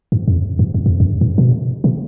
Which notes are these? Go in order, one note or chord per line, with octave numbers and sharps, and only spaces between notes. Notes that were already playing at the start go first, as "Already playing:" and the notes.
G2
F2
G2
F2
G2
F2
F2
G2
G#2
B2
C3